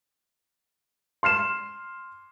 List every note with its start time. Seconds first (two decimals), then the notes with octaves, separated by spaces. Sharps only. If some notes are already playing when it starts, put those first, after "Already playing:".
1.23 C6 F6 C7 E7